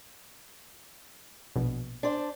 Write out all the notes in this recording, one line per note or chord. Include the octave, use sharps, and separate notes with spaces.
A#1 B2
D4 C5 D5